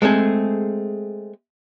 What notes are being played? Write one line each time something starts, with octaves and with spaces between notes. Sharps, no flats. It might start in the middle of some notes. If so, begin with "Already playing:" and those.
G#3 A3 C4 G#4 A4